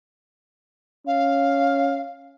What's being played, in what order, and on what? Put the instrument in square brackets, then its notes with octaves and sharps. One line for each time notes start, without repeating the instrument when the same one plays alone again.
[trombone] C#4 [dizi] F5